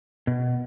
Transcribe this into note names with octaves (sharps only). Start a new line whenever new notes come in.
B2